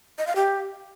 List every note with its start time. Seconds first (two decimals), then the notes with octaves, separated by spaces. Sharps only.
0.19 D#5
0.27 F5
0.36 G4